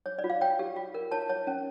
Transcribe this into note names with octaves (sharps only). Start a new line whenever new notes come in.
C#5
D5
F4
F5
C#5 G5
G4
F4
A#4
C#5 A5
C#5
C#4